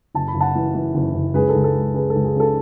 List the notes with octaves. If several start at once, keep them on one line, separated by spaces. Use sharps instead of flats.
F#1 A5
B5
F#1
F#5 A5
E3
E3
F#1
F#1
C#2 G#4 B4
A4
C#2
A4
G#3
C#3 G#4 B4
A4
C#2
G#4
C#3 A4